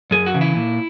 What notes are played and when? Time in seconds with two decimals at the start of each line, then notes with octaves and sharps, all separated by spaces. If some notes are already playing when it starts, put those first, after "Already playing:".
0.11 F#2 G#4
0.26 F#4
0.34 C#3 E3
0.41 E4
0.55 A#2